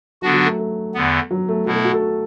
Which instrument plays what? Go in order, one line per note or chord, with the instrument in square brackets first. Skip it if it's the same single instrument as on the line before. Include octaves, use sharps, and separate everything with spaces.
[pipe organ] D3 B3 D4 F#4 [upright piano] F#3
[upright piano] F#3
A3
A3
[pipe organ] E2 D3 B3
[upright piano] F#3
A3
[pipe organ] B2 B3 E4 [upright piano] F#3
[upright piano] A3
F#4
A4